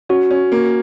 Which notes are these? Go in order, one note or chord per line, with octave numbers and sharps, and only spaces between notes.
C#4 F#4
C#4
A#3